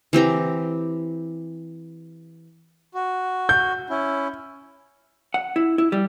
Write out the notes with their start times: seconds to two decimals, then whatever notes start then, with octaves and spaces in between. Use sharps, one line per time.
0.13 E3 C4 G4 A#5
2.93 F#4
3.49 G6
3.90 C#4 E4
5.34 F#5
5.56 E4
5.78 E4
5.92 G3